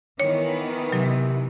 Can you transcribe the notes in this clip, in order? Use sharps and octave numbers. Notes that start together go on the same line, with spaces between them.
D#3 E3 B3 C#5
C3 F#3